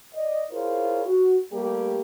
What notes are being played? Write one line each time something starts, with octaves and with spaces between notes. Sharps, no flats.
D5 D#5
E4 F4 G#4 A#4 C5 C#5
F#4
G3 A3 A#3 G4